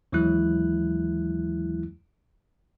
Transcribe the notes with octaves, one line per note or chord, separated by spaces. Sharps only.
D#2 E3 F#3 G#3 E4 F#6